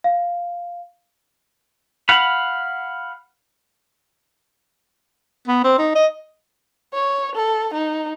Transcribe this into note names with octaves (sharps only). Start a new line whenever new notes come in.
F5
F5 F#5 B5
B3
C4
D#4
D#5
C#5
A4
D#4